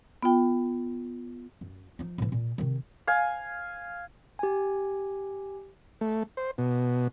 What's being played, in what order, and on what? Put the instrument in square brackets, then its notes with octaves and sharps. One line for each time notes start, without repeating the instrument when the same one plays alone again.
[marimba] B3 F4 G5
[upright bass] F#2
F3 D#4
A2 E3
A#2
C3 D#3
[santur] F5 G#5
[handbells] G4 G#5
[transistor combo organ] A3
C5
B2